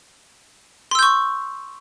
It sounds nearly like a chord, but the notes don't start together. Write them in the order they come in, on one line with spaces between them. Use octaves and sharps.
C6 E6 G6 C#6